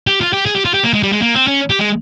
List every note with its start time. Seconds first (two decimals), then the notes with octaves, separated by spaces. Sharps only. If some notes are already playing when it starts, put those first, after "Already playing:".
0.07 G4
0.21 F4
0.33 G4
0.46 G#4
0.56 G4
0.65 F4
0.74 G4
0.84 A#3
0.94 G#3
1.03 G3
1.13 G#3
1.22 A#3
1.35 C4
1.47 C#4
1.70 G4
1.79 G#3